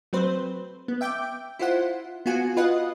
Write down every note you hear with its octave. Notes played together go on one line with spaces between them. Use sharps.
F#3 A3 C4 B4 C5
B3
E5 G5 D6 G6
E4 F4 C5 F#5
B3 F4 F#4 G#5
F4 B4 D#5 F#5